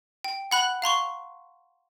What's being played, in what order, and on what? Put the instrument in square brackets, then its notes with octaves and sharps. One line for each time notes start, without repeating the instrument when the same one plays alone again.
[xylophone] G5
F#5 B5 F#6 F#7
F5 A#5 C6 C#6